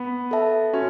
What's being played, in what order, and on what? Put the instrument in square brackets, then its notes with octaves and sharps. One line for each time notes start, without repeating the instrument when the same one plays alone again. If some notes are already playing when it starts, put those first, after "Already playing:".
Already playing: [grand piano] B3
[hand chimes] A4 E5 A5
[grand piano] C#4 [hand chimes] F#4